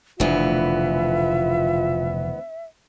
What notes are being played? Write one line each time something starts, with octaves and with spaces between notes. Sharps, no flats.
F1 D2 B2 E3 B3 F4 E5